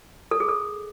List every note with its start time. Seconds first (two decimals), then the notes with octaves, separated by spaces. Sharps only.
0.31 A4
0.40 G#4
0.48 A4